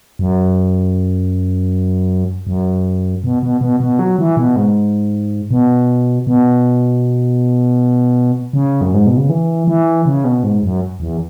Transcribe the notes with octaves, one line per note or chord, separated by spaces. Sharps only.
F#2
F#2
B2
B2
B2
B2
F#3
E3
B2
G#2
B2
B2
C#3
F#2
G#2
B2
C#3
E3
E3
C#3
B2
G#2
F#2
E2